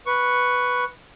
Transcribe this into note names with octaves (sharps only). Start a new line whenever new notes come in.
B4 C#6